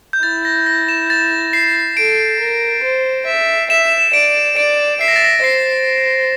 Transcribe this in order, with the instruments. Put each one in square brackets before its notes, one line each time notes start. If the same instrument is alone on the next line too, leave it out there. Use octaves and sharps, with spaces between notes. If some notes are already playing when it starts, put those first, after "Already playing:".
[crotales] G6
[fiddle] E4 [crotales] A6
[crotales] A#6
A#6
E7
A6
C7
[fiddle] A4 [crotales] D7
[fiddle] A#4
C5
E5
[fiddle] E5 [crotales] E7
[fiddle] D5 [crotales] D7
[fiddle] D5 [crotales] D7
[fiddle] E5 [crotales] C7
[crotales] A#6
A6
A#6
[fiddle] C5 [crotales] C7